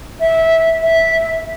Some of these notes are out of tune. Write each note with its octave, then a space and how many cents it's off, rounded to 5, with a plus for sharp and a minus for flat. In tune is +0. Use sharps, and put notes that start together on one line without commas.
E5 -15
E5 -10